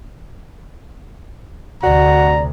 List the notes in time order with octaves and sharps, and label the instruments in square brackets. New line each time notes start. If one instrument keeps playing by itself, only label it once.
[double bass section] D2 C3 [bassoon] F#4 [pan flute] D5 [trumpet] A#5